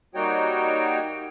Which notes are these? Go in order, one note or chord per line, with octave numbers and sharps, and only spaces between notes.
G3 A#3 D#4 F#4 C#5 G5